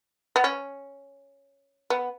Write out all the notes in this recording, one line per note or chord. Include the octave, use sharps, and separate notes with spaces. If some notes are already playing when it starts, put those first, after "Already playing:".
B3
C#4
B3